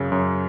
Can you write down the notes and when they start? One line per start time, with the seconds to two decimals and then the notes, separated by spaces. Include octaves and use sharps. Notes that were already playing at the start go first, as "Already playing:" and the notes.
Already playing: F#2 C#3
0.12 F#2